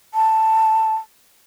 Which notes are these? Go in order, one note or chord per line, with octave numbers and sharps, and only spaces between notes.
A5